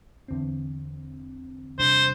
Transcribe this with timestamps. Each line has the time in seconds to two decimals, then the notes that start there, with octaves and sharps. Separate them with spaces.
0.28 E2 D3 C4
1.78 E2 C3 G3 D4 C5